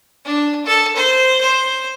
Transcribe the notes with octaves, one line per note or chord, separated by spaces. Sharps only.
D4
A4
C5
C5